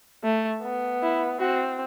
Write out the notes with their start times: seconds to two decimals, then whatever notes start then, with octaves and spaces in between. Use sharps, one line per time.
0.24 A3
0.62 B3
1.02 E4
1.40 C4 F#4